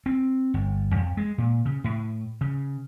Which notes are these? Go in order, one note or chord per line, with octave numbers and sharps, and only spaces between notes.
C4
G1
F2
G#3
A#2
C#3
A2
C#3